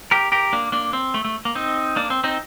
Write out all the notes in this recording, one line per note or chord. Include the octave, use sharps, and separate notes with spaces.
G4 A#4
G4 A#4
A#3 D4
A#3 D4
C4
A3
A3
A#3
C4 D#4
A#3 D4
C4
C4 D#4